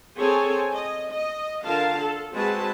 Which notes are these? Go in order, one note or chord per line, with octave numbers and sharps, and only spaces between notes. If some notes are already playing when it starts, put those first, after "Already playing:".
C4 G#4 A4 C#5 G#5
D#5
D#5
D3 F4 A#4 F5 A5
A4
G#3 C4 F#4 G#4 B4 A5